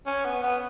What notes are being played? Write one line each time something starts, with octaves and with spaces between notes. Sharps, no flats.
C#4
B3
B3